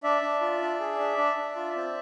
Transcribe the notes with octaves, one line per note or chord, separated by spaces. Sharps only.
D4 D5 E5
D4
F4
D4
G#4
D4
D4
D4
F4
C4